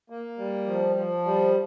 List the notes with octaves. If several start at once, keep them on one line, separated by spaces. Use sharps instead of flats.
A#3
G3
F3
F3
G3